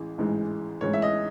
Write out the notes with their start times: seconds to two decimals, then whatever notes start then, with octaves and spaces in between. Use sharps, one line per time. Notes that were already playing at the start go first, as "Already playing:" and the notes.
Already playing: A1 E3 G#3
0.18 A1 G#2 E3 G#3
0.81 A1 G#2 E3 G#3 C#5
0.93 E5
1.02 D#5